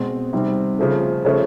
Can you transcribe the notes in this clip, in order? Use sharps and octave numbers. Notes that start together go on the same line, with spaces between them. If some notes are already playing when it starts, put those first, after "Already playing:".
Already playing: B2 G#3 C4
C3 D#3 G3 C4
C#3 F3 A3
C#3 F3 A3 C#4